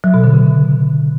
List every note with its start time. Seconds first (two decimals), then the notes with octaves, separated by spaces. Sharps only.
0.04 F#3
0.14 B2
0.24 D3
0.34 C#3